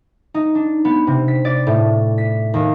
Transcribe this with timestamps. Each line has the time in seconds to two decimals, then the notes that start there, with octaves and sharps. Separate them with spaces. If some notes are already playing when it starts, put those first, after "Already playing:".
0.34 D#4
0.55 D4
0.85 B3
1.07 C3
1.28 B6
1.45 D5
1.67 A2
2.18 B6
2.54 D#2